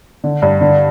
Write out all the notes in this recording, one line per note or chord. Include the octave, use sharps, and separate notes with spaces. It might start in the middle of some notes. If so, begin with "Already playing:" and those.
D3
G2
D3